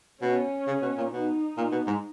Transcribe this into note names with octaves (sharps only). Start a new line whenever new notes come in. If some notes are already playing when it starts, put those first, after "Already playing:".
B2 C#4
C#3
B2
A#2
B2 D#4
A#2
B2
G#2